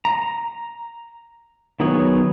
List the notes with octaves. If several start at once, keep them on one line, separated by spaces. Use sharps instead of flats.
A#5
D#3 F#3 B3 G#4 C#5